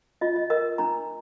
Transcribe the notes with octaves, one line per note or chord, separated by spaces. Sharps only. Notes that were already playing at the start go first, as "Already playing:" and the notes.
F4 D#5
D#5
A#4 D#5
D4 A#5